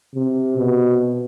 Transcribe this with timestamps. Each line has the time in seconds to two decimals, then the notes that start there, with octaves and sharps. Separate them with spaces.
0.14 C3
0.57 B2